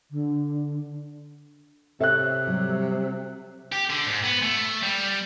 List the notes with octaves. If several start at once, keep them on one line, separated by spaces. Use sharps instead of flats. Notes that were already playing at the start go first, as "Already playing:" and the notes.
D3
C3 A4 C#5 E5 F#6
F#3 G3
G4
D3
G#2
B3
A3
G3